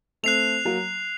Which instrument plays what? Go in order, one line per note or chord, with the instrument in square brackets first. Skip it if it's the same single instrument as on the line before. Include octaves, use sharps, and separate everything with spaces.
[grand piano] A3 C4 [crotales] F#6 C7 F7
[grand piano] F#3 A#3